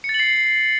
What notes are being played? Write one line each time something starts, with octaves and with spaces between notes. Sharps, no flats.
C#7
A6
F#7
C7